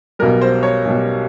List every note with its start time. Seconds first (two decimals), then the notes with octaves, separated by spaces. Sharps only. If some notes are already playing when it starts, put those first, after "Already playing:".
0.19 B1 B2 G3 A#4
0.41 C5
0.63 C#5
0.85 B1 B2 G3